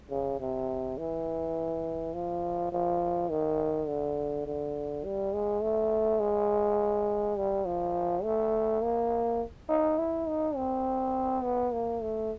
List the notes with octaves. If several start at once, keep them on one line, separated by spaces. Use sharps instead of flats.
C#3
C3
E3
F3
F3
D#3
D3
D3
G3
G#3
A3
G#3
G3
F3
A3
A#3
D#4
E4
D#4
C4
B3
A#3
A3